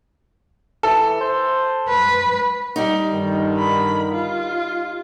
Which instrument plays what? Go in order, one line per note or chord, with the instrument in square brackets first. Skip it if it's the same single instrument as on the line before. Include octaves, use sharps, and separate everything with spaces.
[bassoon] E3 [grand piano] A4
[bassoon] C5
[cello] B4
[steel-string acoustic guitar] G3 D#4
[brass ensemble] G2 D3 D#3
[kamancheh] B5
F4